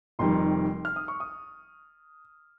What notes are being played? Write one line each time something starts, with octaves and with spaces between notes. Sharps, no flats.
F1 F2 D#3 G3 C6
F6
D#6
C#6
D#6